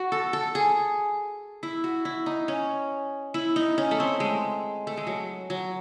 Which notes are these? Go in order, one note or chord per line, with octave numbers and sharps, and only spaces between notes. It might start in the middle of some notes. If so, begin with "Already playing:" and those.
Already playing: F#4
A4
A4
G#4
E4
F#4
E4
D#4
C#4
E4
D#4
C#4
A3
C4
G#3
A3
G#3
F#3
F#3